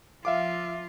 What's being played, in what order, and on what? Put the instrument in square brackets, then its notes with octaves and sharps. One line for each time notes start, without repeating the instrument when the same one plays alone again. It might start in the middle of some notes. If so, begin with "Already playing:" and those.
[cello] F3 F4 [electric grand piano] E5 F5 D6